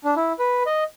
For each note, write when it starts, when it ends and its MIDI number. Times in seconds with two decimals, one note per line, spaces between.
0.04 0.14 62
0.16 0.33 64
0.39 0.63 71
0.66 0.84 75